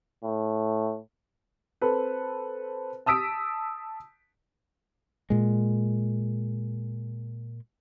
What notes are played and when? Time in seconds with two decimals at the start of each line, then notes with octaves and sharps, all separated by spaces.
0.24 A2
1.82 C4 A4 B4
3.06 A5 D#6 E6 B6 D7
5.30 A#2 G#3